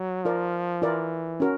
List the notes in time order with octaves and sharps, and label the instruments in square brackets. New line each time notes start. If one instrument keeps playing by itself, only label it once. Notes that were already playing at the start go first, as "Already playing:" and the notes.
Already playing: [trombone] F#3
[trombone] F3 [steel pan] F4 A#4 D5
[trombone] E3 [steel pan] F4 A#4 D5
[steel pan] C#4 F#4 A#4